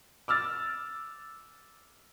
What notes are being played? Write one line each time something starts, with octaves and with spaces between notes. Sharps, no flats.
D6 E6 F6 A6